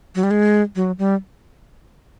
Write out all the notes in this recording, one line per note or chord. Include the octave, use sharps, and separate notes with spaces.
F#3
G3
G#3
F#3
G3